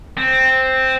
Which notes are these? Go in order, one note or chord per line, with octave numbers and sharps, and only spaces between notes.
C4